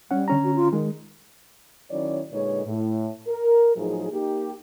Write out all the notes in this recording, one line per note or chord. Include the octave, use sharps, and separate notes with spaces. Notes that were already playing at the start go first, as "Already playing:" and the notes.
G3 C#4 F#5
D3 C#4 A#5
F#4
F4
D#3 G#3
D#3 F#3 C#4 E4 C#5 D5
A#2 D3 G#3 D#4 B4 C#5
A2
A#4
A2 F3 F#3 D#4 G#4
A#3 D#4 G4